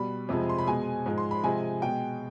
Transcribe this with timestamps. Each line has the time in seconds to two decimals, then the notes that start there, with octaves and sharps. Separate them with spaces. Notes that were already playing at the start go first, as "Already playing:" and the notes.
Already playing: B2 G3 B5
0.29 F2 C3 F3 G#3
0.49 C6
0.59 B5
0.67 B2 G#3 G#5
1.06 G#2 F3 G#3
1.18 C6
1.31 B5
1.44 C3 F3 G#3 G#5
1.82 B2 G#3 G5